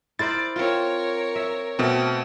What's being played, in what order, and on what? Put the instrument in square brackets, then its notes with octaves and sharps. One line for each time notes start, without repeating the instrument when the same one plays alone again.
[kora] E4 A#4 C5 [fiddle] D5 [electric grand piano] A6
[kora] C4 F4 [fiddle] A#4 C#5
[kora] E5
[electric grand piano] B2 C4 [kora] A3